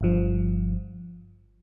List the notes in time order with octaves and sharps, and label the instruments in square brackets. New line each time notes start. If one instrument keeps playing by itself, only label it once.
[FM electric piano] G1 G2 F3